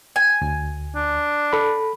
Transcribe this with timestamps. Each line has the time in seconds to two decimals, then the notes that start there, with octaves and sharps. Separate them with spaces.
0.16 G#5
0.41 D2
0.96 D4
1.53 A4 B5